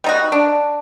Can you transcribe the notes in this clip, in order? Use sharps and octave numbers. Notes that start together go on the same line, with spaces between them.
G3 D#4 F#4
D4